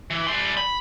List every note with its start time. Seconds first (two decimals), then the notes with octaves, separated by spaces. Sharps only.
0.11 E3
0.27 G3 C6
0.57 B5